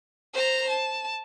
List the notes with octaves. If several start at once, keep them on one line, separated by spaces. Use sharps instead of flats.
C5 A#5
A5